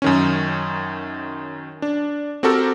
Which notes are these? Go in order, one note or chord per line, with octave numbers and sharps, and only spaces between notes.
F#2 D#3 C#4
D4
C4 F#4 G4 A4 A#4